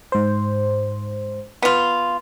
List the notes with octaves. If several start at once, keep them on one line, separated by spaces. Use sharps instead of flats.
G#2 C5
B3 F4